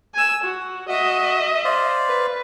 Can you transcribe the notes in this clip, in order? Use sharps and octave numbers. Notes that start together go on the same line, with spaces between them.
G#5 E6
F#4
F#4 D#5 E5
C5 D5 F5
B4